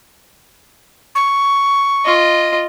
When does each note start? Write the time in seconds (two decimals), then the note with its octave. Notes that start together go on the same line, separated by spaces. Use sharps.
1.15 C#6
2.05 F4 D#5